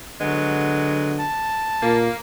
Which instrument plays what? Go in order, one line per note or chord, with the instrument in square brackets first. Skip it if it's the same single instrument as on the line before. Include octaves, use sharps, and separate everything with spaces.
[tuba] D3 [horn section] F#3 G#3 B3
[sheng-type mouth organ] A5
[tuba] A#2 [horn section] A#3